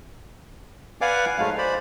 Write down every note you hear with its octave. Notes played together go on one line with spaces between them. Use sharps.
B4 D5 F5 F#5 G#5 D6
G#2 F#3 G#3 A3 F5
C5 D5 B5